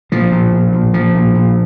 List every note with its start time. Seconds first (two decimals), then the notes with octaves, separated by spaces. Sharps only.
0.12 A#2 F3
0.32 A#2
0.53 A#2
0.73 A#2
0.93 A#2 F3
1.15 A#2
1.35 A#2